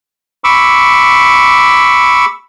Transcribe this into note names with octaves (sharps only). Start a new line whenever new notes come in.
B5 C#6 D6 E6